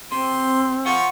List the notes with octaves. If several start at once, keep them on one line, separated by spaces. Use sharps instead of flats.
C3 C4 C6
F3 F4 F#5 C6 C#6